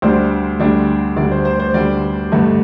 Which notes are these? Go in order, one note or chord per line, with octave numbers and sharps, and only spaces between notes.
D2 D3 G3 D4 C5
D2 D3 G3 D4
D2 D3 G3 D4 D5
C5
C5
C5
D2 D3 G3 D4 D5
A1 G2 D3 A3